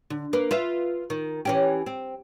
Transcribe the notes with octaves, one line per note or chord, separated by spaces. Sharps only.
D3
A#3 B4
F4 B4 E5
D#3
E3 C#4 G4
C4